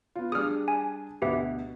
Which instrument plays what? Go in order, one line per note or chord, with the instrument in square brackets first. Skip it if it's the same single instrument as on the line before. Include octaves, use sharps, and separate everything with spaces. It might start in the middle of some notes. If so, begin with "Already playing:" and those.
[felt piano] B3 F4
[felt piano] G3 D4 G#4 [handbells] D#6 F6
[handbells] G#5
[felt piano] D2 B2 [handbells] G4 B4 E5